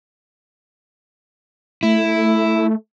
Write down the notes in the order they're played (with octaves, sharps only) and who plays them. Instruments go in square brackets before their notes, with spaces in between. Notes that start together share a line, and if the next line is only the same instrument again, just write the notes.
[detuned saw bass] A3 [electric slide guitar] E4